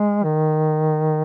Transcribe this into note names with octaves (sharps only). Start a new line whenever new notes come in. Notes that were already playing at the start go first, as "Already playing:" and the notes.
Already playing: G#3
D#3